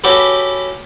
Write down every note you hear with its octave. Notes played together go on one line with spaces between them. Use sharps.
C#4 E4 F#4 G4 A4 B4